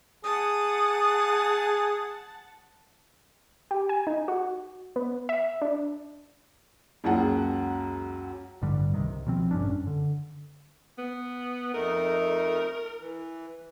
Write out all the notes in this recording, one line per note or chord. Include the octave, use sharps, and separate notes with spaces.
G#4 F#5 A5 D#6
G4
G#5
D#4
F#4
B3
E5
D4
C#2 F#2 A#3 G#4 F#5 A5
A1 G2 D3 G3
C2 C3 D#3
B2 F3 C4
A1 G2 C#4 D4
F#2
D3
B3
F2 A3 D#4 A#4
E3